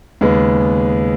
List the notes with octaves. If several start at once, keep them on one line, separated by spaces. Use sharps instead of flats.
D#2 C#3 G#3 B3